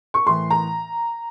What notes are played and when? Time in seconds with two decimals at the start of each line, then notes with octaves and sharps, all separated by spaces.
0.14 C#6
0.26 A2 E3 C6
0.51 A#5